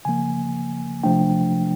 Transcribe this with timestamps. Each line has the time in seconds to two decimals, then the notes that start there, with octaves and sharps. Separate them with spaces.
0.05 C#3 F3 A#3 G#5
1.03 C3 F3 A3 D4 G5